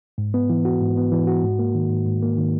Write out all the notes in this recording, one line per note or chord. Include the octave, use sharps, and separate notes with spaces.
G#2
B3
E3
F#4
G#2
B3
E3
F#4
G#2
A#3
D#3
G#2
G#2
A#3
D#3